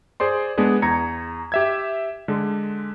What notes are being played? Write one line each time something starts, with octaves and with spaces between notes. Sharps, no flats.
G#4 C5 D5 C6
G#3 B3 D4 G#4
E2 A#5 G#6 C#7
G4 E5 G#6
D3 G#3